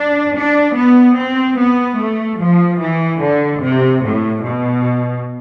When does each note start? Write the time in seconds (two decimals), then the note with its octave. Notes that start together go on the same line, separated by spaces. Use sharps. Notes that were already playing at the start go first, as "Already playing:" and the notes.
Already playing: D4
0.34 D4
0.75 B3
1.15 C4
1.56 B3
1.97 A3
2.39 F3
2.79 E3
3.20 D3
3.60 C3
4.01 A2
4.42 B2